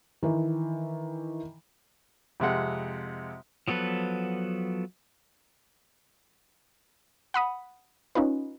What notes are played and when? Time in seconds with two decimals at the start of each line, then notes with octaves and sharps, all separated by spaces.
0.23 D#3 E3
2.40 F2 C3 G#3 F#5
3.68 F3 F#3 B3 A4 B4
7.34 F#5 B5 D#6
8.15 C#4 D#4 F4 B4